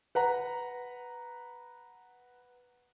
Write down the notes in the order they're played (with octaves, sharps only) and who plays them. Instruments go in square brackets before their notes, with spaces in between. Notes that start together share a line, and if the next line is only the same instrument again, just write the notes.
[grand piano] B4 F#5 A#5